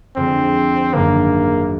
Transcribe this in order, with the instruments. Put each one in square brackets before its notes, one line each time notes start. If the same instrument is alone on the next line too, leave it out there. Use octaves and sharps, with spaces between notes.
[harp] F2 D3 F3 G#3 [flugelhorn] C4
[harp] G#1 F#2 D3 [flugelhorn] A#3